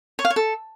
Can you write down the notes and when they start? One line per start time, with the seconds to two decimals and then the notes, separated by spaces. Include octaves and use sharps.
0.19 C#5
0.25 F5
0.30 C#5
0.36 A4